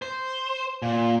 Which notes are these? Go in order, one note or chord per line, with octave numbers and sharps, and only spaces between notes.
C5
A#2